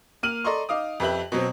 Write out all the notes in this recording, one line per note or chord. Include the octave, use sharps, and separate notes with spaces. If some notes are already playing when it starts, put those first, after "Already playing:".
A#3 F6 D#7 F#7
A4 D5 D#5 A#5 C6 C#6
D#4 F5 D6 D#6
F2 G4 B4 E5 F#7
B2 F#3 C4